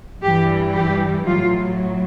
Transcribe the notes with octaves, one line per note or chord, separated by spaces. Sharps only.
G2 E3 G3 G4
G4
A2 F#3 F4